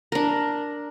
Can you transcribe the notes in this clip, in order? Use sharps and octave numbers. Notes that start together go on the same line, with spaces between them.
D4 A#4